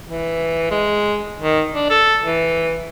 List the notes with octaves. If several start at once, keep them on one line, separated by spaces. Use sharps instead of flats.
E3
G#3
D#3
D4
A4
E3